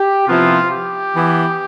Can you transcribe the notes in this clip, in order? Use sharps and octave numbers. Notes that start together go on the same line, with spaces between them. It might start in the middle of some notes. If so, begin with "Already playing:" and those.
Already playing: G4
C3 F3 B3 E4 F4
G4
E3 B3 E4